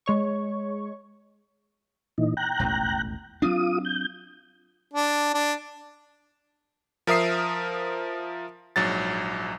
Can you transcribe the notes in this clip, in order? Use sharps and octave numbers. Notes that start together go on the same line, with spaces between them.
G#3 C#5 C#6
A#2 E3 D#4
G5 A#5 F#6
E1 A1 D#2
F#3 C4 D4 F4 D#6
G6
D4
D4
F3 A#4 E5 D#6 C7
A#1 G#2 F#3 A6